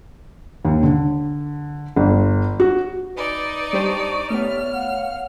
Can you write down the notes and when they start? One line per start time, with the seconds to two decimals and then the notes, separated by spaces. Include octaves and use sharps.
0.65 D#2
0.83 D3
1.96 G1
2.60 F#4
3.16 D#4 B4 D5
3.73 G3 D4 G4 C5 C#6
4.30 A3 B3 G4 C#5 D5 E5 F6
4.72 F5 F#5